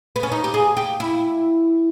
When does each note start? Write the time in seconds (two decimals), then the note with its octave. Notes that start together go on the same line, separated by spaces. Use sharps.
0.16 B3
0.23 C#4
0.32 D#4
0.44 G4
0.54 G#4
0.77 G4
1.00 E4